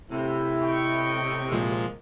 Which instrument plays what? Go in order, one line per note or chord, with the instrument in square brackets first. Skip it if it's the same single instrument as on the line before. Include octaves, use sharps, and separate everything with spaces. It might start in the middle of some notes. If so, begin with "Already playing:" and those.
[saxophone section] A2 C3 [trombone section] E4
[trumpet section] D#5 G5 C#6
[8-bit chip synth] A#2 F3 G#3 [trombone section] A#3